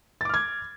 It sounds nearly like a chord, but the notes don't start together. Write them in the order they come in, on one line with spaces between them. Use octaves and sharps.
A6 D6 F6 G#6